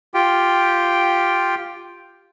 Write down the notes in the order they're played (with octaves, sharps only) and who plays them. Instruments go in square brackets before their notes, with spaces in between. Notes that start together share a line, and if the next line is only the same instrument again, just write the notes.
[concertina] F4 G4 G5